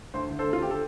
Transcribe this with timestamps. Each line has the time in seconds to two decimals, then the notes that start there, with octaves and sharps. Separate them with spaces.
0.14 D2 C5
0.30 D3
0.39 A4 C5
0.47 D2
0.53 F4
0.62 D3 G4
0.71 A4